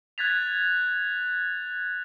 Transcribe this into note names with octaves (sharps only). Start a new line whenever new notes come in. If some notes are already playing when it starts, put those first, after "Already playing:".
F#6 G#6 A6 B6 F7